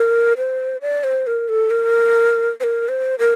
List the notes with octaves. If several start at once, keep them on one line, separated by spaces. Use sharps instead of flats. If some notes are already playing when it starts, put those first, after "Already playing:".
Already playing: A#4
C5
D5
C5
A#4
A4
A#4
C5
A#4
C5
A#4